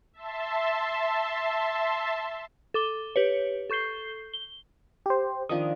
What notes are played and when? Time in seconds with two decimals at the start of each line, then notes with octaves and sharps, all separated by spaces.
0.13 E5 A5 C6
2.74 A4 D6 G7
3.16 G4 B4 C#5
3.70 A4 C#6 G6 C7 G7
4.34 G7
5.06 G4 C5
5.49 D#3 F3 D4 D#6